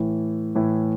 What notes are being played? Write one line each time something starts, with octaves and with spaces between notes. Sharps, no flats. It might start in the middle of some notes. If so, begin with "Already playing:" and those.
Already playing: A2 E3
A2 E3